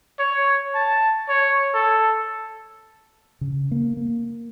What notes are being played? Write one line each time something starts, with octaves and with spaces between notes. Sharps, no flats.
C#5
A5
C#5
A4
C#3
A#3
A#3